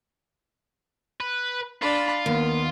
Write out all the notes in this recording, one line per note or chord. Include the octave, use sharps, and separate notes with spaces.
B4
D4 F4 B5
D#2 A#3 B3